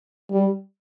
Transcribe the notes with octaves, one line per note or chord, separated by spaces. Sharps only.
G3